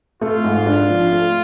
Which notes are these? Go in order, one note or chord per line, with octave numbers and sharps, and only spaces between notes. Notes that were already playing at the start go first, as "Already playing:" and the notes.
A3 F4
G#2
D4
F3
A3